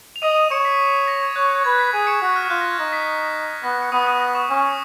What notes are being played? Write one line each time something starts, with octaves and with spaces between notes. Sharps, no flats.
F7
D#5 D#6 D#7
D#6 D#7
C#5 C#6 C#7
B6
A#6
G#6
C#5 F#6
F#6
B4 G#6
B6
G#4 D#6 D#7
C#6 C#7
F#4 B6
F6
F4 F#6
A#6
G#6
D#4 A#6
B6
B6
B3 A#6
C#7
B3 D#6 D#7
D#6 D#7
A#6
C#6
C#4 C#6
D#6